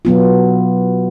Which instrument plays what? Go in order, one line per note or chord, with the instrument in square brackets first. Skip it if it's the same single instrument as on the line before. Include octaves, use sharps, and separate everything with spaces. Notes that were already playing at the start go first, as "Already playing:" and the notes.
[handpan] B2 F#3 B3 F4